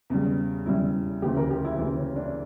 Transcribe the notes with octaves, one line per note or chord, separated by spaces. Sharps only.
E2 C#3 G3
E2 C#3 G3 E4
D2 C#3 E3 G4
A#4
G4
E4
D2 C#3 E3 E4
C#4
D4